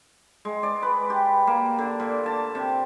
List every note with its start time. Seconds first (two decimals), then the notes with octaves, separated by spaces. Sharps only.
0.45 G#3
0.63 D5
0.83 B4
1.10 G4
1.47 A#3
1.79 D3
2.00 A#2
2.26 A5
2.55 C3